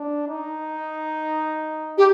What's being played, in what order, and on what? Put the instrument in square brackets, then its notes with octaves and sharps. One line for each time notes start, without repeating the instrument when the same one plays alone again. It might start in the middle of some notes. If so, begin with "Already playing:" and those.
Already playing: [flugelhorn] D4
D#4
[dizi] G4